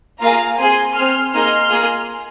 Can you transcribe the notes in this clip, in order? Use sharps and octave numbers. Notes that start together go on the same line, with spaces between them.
A#3 F4 G#4 F5 A#5
C4 G#4 G#5 C6
C4 G#4 C6 F6
A#3 D#4 G#4 C6 F6
A#3 F4 G#4